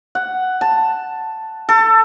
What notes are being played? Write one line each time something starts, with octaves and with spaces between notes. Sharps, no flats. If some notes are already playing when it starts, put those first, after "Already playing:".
F#5
A5
A4